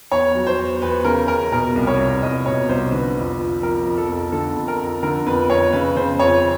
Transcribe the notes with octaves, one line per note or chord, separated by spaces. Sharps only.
E2 C#5
F#3
C5
E2
E2 B4
C#3 A#4
E2 A#4
B2 A#4
C2
C#5
C2
C2 D#5
B2 C#5
C2 C5
D3 B4
F2
F3
F3 A#4
F2
A4
F2
D3 A4
F2
A#4
F2
D3 A#4
F2 B4
F2 C#5
C#3 B4
C#3 C5
F2 C#5